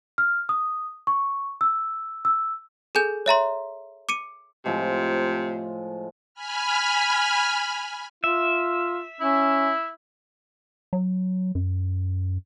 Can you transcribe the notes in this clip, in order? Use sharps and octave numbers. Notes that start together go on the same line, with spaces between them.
F6
D#6
C#6
E6
E6
G#4 A4 G#5 G6
C#5 E5 A#5 C6
D6 C#7 D#7
A2 C3 F3 G#3
G#5 B5 F6
F4 E5
C#4 E4
F#3
F#2